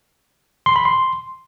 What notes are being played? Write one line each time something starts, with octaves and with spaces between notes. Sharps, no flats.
C6
B5
C6